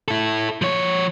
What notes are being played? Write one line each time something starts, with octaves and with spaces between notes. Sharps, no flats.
E4 A4
F3 C#5